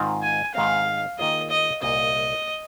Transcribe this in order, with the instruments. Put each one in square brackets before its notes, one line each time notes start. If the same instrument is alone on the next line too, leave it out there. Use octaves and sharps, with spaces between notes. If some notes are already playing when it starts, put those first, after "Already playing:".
Already playing: [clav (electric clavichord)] G#2 D#3 C4 F4
[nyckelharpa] G#5
[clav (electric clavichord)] G#2 D#3 G#3 C4 [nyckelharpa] F5
[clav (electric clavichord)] D#3 A#3 F4 G#4 [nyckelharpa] D#5
[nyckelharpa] D#5
[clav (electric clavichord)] C2 A#2 A#3 F4 [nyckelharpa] D#5